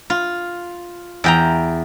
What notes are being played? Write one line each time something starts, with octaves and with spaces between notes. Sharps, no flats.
F4
E2 G5 A#5